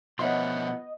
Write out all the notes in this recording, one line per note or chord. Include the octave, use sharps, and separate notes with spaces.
B2 F3 B3 C#5 D#5 E5 F#5 C6